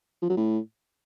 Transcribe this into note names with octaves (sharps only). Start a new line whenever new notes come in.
F3
F#3
A2